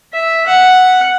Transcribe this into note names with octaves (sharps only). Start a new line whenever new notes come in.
E5
F#5